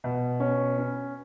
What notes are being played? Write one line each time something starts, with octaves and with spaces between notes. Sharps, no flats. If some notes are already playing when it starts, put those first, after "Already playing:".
B2
C#4
C#4